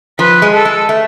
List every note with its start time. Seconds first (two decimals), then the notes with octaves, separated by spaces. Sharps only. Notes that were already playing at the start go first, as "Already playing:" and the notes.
0.19 F3 B4
0.42 G#3
0.54 A4
0.65 G#3
0.89 A3